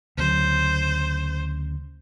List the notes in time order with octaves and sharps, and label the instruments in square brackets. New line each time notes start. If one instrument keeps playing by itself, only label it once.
[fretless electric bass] D2 C#3 F#3 [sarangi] C5